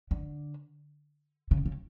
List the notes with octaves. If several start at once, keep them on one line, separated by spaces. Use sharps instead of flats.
D3
C#3
C#3